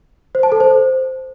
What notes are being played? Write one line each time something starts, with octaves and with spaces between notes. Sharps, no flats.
C5
A5
A4
C5